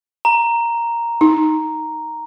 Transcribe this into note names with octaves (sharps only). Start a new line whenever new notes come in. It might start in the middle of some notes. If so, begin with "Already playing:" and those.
A#5
D#4